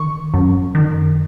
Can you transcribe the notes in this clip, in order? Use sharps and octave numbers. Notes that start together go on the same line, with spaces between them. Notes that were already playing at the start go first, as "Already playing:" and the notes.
Already playing: D#3 C#6
F#2
D#3